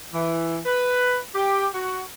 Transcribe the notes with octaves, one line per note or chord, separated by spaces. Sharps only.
E3
B4
G4
F#4